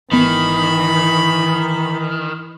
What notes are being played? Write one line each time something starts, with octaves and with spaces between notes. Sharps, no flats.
G#1 D#3 E3 B3 B5